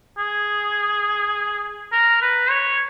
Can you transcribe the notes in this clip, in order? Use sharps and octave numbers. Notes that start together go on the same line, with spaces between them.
G#4
A#4
B4
C#5